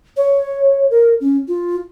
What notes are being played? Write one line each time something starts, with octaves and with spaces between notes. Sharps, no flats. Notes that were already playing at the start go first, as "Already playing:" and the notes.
C#5
A#4
C#4
F4